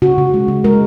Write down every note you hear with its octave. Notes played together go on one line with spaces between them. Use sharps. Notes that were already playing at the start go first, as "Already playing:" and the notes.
C#3 F#4
C#3
G#3
C#3
G#3 A#4